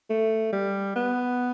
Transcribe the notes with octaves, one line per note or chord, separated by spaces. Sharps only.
A3
G3
B3